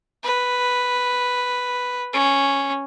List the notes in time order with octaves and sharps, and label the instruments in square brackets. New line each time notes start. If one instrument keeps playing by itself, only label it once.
[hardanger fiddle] B4
C#4